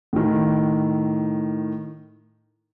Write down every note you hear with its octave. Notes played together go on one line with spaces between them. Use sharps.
A2 D#3